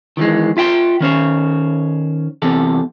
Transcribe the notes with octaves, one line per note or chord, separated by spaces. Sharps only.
D#3 E3 G#3
F4 E5 G5 C6
D#3 C#4 C5 C#5
E2 C3 A4